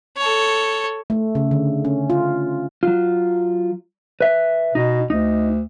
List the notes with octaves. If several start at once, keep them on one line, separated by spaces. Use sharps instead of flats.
A4 C#5
A3
C#3
D3
C#4
F4
F#3 F4
B4 E5
B2 D#4
D2 D#4